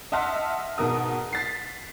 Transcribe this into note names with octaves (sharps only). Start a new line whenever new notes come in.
D#5 E5 F#5 A5 C6 F6
G#2 B2 A#4 D#6
A6 B6 C7